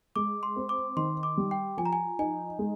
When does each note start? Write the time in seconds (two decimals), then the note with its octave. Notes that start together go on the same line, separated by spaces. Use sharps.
0.16 G#3 D6
0.43 C6
0.56 C4
0.69 D6
0.97 D#3 C6
1.23 D6
1.37 G3
1.51 G5
1.77 F3 G#5
1.85 A#5
1.93 G#5
2.19 D#4 G#5
2.59 G#3